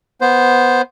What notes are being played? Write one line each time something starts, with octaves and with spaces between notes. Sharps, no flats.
B3 C5